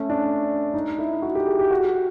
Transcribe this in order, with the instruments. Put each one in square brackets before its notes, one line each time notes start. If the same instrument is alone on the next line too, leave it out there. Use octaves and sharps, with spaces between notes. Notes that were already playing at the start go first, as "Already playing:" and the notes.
Already playing: [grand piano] A3 C#4
D4
D#4
E4
F#4
G4
G#4
G4
F#4